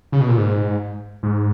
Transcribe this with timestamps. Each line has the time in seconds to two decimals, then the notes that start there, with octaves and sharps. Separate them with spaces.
0.12 C#3
0.21 B2
0.29 A#2
0.37 G#2
1.23 G#2